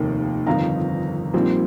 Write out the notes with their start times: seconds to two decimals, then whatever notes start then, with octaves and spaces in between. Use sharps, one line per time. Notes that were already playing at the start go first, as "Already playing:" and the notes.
Already playing: F1 D#2 D#3 A#3 D#4
0.46 G1 F2 D#3 C4 D#4 F5 A#5
1.33 A#1 A#2 G3 C4 D#4